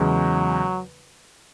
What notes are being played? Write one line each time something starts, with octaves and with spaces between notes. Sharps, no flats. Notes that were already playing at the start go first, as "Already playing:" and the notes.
Already playing: E2 C#3 F#3 G#3